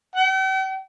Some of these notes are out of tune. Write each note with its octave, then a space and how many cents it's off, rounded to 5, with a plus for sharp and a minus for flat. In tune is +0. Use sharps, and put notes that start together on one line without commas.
G5 -45